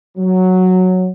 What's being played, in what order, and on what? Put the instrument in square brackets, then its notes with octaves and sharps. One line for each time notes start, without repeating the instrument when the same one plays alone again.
[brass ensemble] F#3